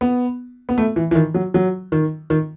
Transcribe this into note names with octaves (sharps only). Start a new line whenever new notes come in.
B3
B3
A3
E3
E3
D#3
F#3
F#3
D#3
D#3